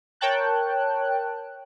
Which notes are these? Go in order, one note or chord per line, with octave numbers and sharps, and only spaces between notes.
A#4 C#5 G5 A5 F#6